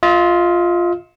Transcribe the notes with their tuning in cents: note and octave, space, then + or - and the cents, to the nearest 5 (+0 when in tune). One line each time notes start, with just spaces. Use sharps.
F4 +0 D#5 +45